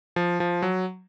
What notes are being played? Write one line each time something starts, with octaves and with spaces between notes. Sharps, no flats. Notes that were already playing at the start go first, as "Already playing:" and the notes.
F3
F3
F#3